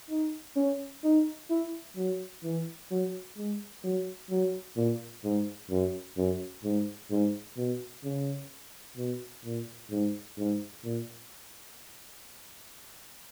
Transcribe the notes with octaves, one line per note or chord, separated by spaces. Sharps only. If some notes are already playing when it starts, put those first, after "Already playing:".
D#4
C#4
D#4
E4
F#3
E3
F#3
G#3
F#3
F#3
A#2
G#2
F#2
F#2
G#2
G#2
B2
C#3
B2
A#2
G#2
G#2
A#2